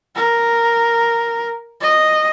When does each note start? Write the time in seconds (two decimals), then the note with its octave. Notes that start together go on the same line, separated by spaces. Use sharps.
0.15 A#4
1.81 D#5